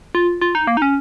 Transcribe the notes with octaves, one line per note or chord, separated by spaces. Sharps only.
F4
F4
D#4
A#3
D#4
C#4